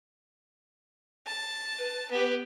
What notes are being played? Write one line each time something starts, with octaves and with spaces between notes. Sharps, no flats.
A5
B4
B3 G4